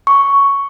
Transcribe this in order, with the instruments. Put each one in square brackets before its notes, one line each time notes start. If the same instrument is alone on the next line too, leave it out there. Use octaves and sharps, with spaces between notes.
[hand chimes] C#6